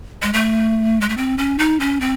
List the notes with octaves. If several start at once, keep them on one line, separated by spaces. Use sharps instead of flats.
G#3
A3
G#3
A3
C4
C#4
D#4
C#4
C4